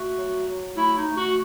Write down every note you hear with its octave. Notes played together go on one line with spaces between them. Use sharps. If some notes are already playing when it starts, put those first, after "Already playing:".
Already playing: A3 F#4
F#3
F#3
A3 E4
D#4
A3
F#4